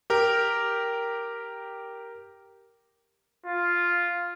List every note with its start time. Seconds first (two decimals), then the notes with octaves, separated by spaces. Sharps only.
0.10 G4 A#4
3.46 F4